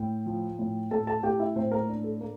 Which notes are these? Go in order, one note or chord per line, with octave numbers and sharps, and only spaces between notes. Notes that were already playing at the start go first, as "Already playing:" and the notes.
Already playing: A2 G5
F3
A2
A2 A4 A5
A4 A5
A2 G4 G5
E4 E5
A2 C4 C5
A#3 A#4
D4
A4
A#3